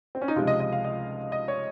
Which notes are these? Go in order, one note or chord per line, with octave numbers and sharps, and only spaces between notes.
C4
C#4
D#4
C#2 C3 F3 G#3 F4
D#5
D#5
F5
D#5
D#5
C#5